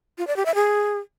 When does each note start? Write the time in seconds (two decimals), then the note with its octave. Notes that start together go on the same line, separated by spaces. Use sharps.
0.18 F4
0.27 D5
0.36 G4
0.46 E5
0.55 G#4